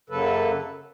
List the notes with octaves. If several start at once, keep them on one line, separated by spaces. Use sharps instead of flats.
F#2 C#3 F#3 A#3 A4 B4